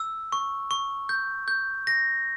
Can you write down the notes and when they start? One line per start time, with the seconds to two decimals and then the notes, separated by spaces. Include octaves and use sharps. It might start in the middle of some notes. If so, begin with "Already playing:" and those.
Already playing: E6
0.32 C#6
0.71 C#6
1.09 G6
1.48 G6
1.87 A#6